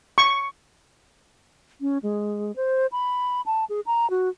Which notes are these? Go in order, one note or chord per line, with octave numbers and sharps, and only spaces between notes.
C#6
C#4
G#3
C5
B5
A5
G#4
A#5
F#4